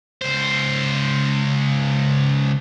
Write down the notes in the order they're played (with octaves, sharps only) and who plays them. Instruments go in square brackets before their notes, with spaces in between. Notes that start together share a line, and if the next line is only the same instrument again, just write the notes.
[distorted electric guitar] C#2 C5